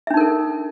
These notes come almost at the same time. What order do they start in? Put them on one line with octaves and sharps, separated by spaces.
E5 D4 D#4 A#4 A4